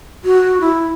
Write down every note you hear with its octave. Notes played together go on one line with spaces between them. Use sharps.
F#4
E4